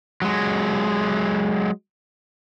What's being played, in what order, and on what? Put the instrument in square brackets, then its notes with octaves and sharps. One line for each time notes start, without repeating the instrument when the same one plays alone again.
[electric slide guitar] F#3 G#3